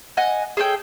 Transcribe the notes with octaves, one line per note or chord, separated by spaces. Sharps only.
D#5 F#5 G#5
G#4 A4 C#5 G5